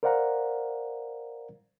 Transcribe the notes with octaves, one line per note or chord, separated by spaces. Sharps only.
A#4 C5 D5 F5 F#5 A#5